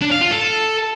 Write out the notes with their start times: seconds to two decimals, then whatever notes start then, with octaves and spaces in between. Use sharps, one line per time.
0.02 D4
0.11 F5
0.21 F4
0.31 A4